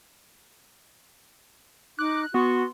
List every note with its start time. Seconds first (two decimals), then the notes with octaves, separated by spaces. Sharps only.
1.99 D#4 D6 F#6
2.34 B3 F#4 C6 C#6